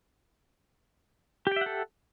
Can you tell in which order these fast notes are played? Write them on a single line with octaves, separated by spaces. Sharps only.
G4 G5 E5 F#5 A4